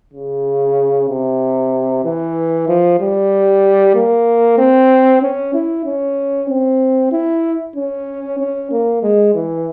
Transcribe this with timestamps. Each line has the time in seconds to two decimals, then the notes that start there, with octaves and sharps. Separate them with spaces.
0.14 C#3
1.09 C3
2.05 E3
2.68 F3
3.00 G3
3.95 A#3
4.58 C4
5.22 C#4
5.54 E4
5.85 C#4
6.49 C4
7.12 E4
7.76 C#4
8.39 C#4
8.71 A#3
9.03 G#3
9.34 E3